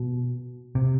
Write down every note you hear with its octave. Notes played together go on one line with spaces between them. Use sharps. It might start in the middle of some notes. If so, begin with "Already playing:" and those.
Already playing: B2
C3